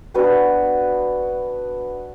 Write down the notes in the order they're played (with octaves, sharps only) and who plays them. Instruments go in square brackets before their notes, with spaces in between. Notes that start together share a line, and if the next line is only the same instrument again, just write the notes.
[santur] B3 D4 F#4 B4